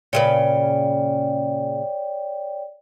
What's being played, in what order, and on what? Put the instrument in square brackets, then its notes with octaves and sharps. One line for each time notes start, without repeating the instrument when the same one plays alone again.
[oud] A#2 C#3 B4 [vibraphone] C#5 D5 G5